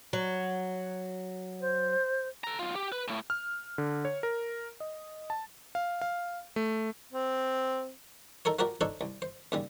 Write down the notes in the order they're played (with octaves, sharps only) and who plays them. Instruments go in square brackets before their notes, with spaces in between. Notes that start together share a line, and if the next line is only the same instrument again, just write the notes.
[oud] F#3
[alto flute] C5
[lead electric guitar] A4 A#5
B1 F4
G4
B4
A2 A3
[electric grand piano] F6
D3
C#5
A#4
D#5
A5
F5
F5
A3
[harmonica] C4
[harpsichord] D#4 A4 A#4 C#5
F3 F#4 G4 A#4 D5
D4 D#4 A4 C5 C#5
C2
C5
D#2 C#3 G3